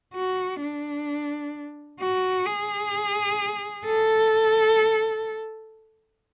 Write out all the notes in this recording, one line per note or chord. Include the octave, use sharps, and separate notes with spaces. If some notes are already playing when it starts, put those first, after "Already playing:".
F#4
D4
F#4
G#4
A4